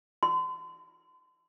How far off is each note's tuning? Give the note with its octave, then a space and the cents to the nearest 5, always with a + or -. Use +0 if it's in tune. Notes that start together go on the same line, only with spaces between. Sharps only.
C6 -40